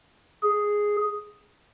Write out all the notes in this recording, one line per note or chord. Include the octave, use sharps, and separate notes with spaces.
G#4